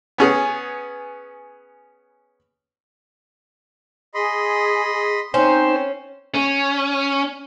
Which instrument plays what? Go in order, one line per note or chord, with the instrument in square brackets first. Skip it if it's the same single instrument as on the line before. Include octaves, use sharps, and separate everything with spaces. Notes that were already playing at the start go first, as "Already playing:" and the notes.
[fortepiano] B3 C#4 G#4
[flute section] G#4 [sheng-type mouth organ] D#5 B5 C6
[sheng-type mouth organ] C4 [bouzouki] C#4 [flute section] D#4 [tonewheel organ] C5
[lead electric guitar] C#4